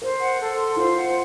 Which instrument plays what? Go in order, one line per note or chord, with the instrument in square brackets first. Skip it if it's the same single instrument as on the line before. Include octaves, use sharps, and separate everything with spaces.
[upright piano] A#4 [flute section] C5
[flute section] F#5
A4
C6
[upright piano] F4 [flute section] C5
[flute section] F#5